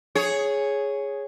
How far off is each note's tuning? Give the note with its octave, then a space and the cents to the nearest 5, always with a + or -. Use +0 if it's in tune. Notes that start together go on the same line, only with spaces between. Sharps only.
G#4 +0 C#5 +0